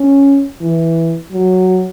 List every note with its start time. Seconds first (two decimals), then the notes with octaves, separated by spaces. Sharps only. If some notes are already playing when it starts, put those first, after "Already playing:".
Already playing: C#4
0.61 E3
1.33 F#3